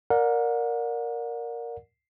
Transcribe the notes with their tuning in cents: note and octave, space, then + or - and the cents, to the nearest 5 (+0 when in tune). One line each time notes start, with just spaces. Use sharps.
A#4 +0 D5 +0 F#5 -35